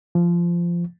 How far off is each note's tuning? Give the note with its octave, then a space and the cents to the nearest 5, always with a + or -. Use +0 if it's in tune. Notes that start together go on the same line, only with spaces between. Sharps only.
F3 -15